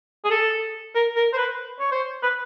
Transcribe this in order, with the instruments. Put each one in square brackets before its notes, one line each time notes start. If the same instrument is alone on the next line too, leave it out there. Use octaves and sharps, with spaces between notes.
[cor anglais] G#4
A4
A#4
A#4
C5
B4
C#5
C5
B4